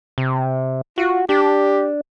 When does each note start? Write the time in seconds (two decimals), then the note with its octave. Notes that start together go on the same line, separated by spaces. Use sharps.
0.18 C3
0.98 F4 F#4
1.29 D4 G4